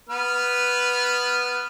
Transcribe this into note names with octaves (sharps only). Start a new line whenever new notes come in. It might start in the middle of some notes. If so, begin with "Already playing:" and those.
B3 B4 F6